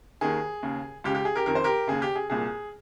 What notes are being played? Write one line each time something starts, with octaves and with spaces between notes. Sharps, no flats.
D#2 D#3 G#4
D#2 C#3
C#2 C#3 G4
G4
G#4
G4 A#4
F2 D#3 A#4
C5
G4 A#4
D#2 C#3 G#4
G4
G#4
C2 A#2 G#4